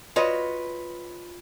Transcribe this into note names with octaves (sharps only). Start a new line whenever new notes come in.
F4 F#4 B4 C#5 D#5